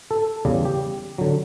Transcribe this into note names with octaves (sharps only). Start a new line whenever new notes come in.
A4
E2 C#3 G3
G4
D3 F#3